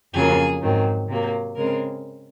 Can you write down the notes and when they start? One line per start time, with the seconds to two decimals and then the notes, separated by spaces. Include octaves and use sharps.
0.13 F2 C#3 F#3 A#3 G#4
0.61 G#2 D#3 F#3 C4
1.08 C3 F#3 A#3
1.55 C#3 G#3 C4 A#4